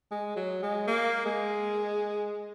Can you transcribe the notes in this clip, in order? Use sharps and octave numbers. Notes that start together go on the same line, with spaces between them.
G#3
F#3
G#3
A#3
G#3